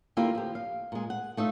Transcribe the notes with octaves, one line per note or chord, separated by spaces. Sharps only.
D3 A#3 E4 F4 G4 A#4
F3 G4
F5
A#2 G#3
F#5
A3 D#4 F4 E5